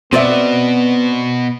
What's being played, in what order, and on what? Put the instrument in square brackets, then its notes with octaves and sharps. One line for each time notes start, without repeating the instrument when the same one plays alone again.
[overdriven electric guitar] B2 [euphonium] B3 [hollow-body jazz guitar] C4 D5 E5